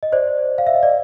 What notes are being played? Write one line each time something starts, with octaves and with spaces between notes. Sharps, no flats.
D#5
C5 D5
F5
E5
D#5
D5